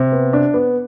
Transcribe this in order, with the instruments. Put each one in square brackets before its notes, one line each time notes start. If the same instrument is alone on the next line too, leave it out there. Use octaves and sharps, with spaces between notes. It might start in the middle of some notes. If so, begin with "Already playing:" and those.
Already playing: [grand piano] C3
B3
D4
B3